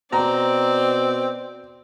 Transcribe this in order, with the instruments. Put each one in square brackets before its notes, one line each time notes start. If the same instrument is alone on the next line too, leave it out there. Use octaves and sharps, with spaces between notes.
[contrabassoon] B2 [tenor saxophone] C4 [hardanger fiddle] D5 [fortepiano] A#5